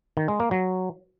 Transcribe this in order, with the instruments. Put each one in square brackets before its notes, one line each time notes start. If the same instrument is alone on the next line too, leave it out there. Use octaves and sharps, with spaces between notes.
[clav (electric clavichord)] D#3
G#3
A#3
F#3